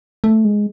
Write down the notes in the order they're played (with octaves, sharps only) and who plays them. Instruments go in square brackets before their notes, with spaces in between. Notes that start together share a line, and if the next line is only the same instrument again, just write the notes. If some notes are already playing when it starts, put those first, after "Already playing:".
[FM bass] A3
G#3